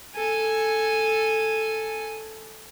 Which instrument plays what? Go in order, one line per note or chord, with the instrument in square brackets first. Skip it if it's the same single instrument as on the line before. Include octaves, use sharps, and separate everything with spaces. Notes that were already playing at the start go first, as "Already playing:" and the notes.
[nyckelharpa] A4 G#5